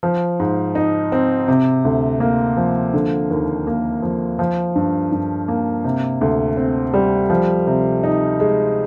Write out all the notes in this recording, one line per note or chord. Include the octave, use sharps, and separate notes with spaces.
F3
G#2
D#4
C4
C3
D2
A#3
F3
D3
D#2
A#3
F3
F3
G2
G2
A#3
C3
D2
C4
G3
F3
C3
D#4
G#3